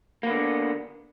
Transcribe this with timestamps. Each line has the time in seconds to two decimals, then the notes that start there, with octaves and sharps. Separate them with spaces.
0.23 A#3
0.27 B3
0.30 D3